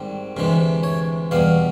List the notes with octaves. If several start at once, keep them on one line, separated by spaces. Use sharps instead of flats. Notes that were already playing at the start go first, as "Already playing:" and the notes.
Already playing: G#2 D#3 G3 C4
D2 C3 E3 G#3
C#5
E2 B2 G3 B3 F5